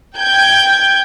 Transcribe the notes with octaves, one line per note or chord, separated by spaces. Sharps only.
G5 G6 G#6